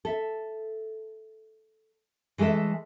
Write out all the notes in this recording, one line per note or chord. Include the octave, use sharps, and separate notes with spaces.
A4 E5
E3 G#3 A3 A4 E5